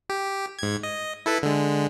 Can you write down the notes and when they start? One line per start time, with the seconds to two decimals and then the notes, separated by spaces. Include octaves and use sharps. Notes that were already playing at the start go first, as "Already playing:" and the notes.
0.09 G4
0.59 G#2 G#6
0.83 D#5
1.26 E4 A4 B4
1.43 D3 G#3